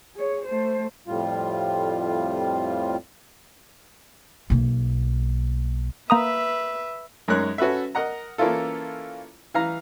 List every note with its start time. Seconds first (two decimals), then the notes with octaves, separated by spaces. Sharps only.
0.16 G#4 C#5
0.45 A3 C5
1.07 F2 A2 G3 F4
4.50 B1 A#3
6.10 A#3 B4 E5 A#5 D#6
7.28 F#2 G#3 D#4 A#4 C#5 F#6
7.58 C#4 F#4 A4 B4 E5
7.95 A#4 D#5 F#5 A#5
8.38 E3 A#3 C#4 E4 F4 A4
9.54 E3 F5 A#5